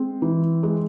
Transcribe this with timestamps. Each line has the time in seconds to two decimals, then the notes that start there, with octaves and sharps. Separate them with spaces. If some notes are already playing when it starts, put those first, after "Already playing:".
Already playing: G#3 C4
0.22 E3
0.63 G#3